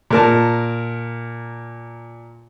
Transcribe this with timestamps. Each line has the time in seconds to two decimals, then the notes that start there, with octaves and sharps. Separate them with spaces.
0.10 A#2 A#4 A5